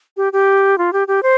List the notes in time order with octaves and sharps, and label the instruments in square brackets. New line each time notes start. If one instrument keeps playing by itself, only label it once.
[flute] G4
G4
F4
G4
G4
C5